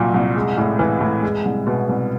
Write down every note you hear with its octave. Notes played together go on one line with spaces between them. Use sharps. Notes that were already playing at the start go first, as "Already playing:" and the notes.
Already playing: C2 A#2 F#3
C2
G#3
A2
E3
A2
G#3
C2
B2
C2